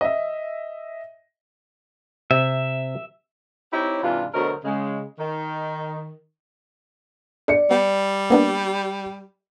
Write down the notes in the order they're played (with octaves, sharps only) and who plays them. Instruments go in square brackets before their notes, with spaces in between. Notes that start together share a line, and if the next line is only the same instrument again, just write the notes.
[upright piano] D#5 E5
[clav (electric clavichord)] C3 [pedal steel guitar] E5
[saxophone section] C4 D#4 E4 G4 C#5
G#2 C3 E3 D4 F4
D2 B2 F#3 A#4 C5 D#5
C#3 G#3
D#3
[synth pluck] D4 [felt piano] D5 C#7
[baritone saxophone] G3 [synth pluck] B3
[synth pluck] A#3 B3 D4